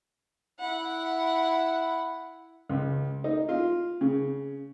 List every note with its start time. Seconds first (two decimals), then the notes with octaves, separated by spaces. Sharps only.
0.59 E4 F#5
2.70 C#2
3.24 D#4
3.49 F4
4.01 C#3